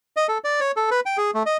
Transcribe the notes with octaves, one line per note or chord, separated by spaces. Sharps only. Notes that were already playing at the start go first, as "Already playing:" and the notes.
D#5
A4
D5
C#5
A4
B4
G5
G#4
A3
D#5